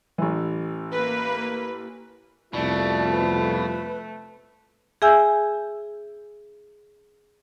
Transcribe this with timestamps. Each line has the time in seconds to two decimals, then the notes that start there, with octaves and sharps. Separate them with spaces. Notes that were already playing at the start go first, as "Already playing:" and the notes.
0.18 A1 E3
0.92 A#3 B4
2.53 C2 F2 B2 A3 F4 D5
3.12 B4
5.02 G#4 E5 G#5 E6 G6